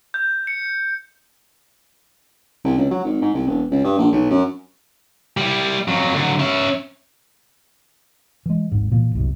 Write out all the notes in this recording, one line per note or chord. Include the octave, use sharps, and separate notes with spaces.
G6
C#7
C2
C#2
F#3
G#1
G#2
C2
E1
C#2
G2
A#1
B1
F#2
G3 E4
F2 F#3
D3 F#3
C#4 E5
E3 G#3
G#1 D#2 G#2
A#2 E3 A#3
G1 C2 F#2